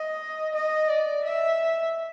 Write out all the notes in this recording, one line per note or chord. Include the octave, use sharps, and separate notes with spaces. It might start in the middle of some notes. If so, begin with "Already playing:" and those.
Already playing: D#5
D#5
D5
E5